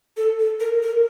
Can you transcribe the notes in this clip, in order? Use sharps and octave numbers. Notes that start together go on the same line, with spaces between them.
A4
A4
A#4
A#4